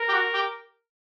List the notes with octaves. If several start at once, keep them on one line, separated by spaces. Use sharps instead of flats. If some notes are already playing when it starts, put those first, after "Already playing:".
Already playing: A#4
G4
F#4
G4